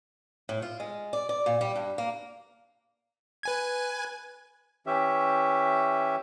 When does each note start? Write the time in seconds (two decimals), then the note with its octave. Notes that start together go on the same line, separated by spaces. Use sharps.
0.49 A2
0.62 F4
0.80 G#3
1.13 D5
1.29 D5
1.46 A#2
1.61 G3
1.76 G2
1.98 A#3
3.43 B4 G#5 G#6
4.86 E3 C#4 G4 E5